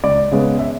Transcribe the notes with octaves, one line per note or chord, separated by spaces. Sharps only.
C#2 D5
C#3 G#3 B3
E5